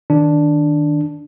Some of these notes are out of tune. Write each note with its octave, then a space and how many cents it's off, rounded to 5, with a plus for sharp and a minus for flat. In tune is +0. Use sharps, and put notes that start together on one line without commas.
D#3 +0 D4 +0